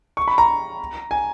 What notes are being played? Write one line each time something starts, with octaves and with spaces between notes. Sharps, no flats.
C#6
B5
A#5
G#5